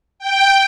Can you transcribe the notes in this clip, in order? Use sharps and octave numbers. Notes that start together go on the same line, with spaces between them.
G5